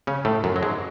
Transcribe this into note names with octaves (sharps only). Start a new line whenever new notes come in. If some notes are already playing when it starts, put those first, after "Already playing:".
C#3 C#4
A2 A3
F#2 F#3
F#3
G#2 G#3